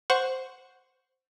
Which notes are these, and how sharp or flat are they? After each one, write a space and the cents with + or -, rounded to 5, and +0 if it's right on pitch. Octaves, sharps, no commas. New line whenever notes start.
C5 +0 F#5 +0 C#6 +0